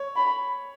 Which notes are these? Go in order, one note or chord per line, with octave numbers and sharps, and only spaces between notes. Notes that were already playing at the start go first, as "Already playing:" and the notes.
Already playing: C#5
B5